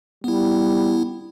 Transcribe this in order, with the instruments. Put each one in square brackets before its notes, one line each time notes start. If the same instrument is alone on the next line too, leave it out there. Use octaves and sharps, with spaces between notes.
[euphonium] G3 [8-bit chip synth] B3 E4